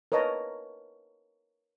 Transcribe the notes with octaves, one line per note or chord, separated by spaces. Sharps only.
A#4 B4 C#5 D#5 A5 A#5